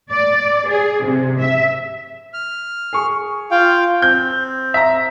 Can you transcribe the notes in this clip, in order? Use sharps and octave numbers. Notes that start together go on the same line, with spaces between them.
D5
G#4
C3
E5
F6
G#4 C#6
F4 F5 G5
C4 G6
E5 A#5